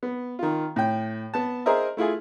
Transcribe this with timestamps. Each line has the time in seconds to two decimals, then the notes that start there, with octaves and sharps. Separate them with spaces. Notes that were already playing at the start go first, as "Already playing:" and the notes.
0.03 B3
0.39 D#3 F4
0.76 A2 G5
1.34 B3 A5
1.66 G#4 A#4 C5 D#5 E5
1.97 A3 E4 F4 G#4